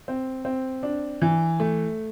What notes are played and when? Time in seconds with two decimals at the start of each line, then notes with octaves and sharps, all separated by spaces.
0.08 C4
0.45 C4
0.83 D4
1.22 E3
1.60 A3